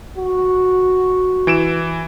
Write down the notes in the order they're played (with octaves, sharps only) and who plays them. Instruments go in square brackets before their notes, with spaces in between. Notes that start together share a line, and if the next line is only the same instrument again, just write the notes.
[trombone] F#4
[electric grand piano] E3 D7 E7